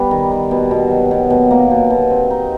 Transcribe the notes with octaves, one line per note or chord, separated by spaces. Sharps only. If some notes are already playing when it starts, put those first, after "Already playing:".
Already playing: G3 B3
D#3
G3
B2
B2
F#3
B2
B2
A#3
B2
B2
C4
D#4